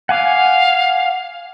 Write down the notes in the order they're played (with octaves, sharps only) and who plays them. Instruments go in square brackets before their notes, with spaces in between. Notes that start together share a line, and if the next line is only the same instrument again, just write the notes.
[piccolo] F5 [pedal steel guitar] F#5 G#5 D6